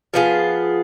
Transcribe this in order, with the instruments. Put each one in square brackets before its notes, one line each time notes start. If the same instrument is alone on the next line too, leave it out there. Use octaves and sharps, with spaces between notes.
[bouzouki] F3 B3 F4 G#4